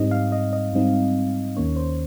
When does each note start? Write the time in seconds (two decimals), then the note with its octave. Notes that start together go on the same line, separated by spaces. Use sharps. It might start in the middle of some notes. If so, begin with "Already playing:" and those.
Already playing: G#2 G3 C4 D#4 D#5
0.11 F5
0.32 D#5
0.53 D#5
0.73 G#2 G3 C4 D#4
1.56 D#2 D#3 A#3 C#4 C#5
1.76 C5